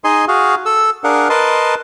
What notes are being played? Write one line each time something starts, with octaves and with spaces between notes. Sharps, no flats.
D#4 G#4 D#5 G#5 C6
F#4 G#4 F5
A4 E6
D4 G#4 A#4 F5 F#5
A#4 B4 D#5 A5 C6